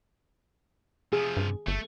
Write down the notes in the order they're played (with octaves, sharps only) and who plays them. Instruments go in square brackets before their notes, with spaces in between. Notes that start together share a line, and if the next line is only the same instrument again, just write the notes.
[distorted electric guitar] C3 F3 [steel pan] G#4
[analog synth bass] G2
[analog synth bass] G1 [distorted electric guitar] A3